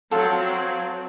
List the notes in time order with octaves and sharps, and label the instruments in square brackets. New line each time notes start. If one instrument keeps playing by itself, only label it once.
[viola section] F#3 C4 [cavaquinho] F4 A4